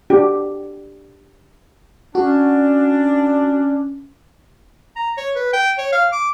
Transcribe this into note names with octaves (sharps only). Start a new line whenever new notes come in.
D4 F#4 G4
C#4 D4 F#4
A#5
C#5
B4
G5
C#5
F5
D6